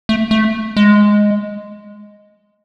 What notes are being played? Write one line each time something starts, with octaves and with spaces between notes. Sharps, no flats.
A3
A3
G#3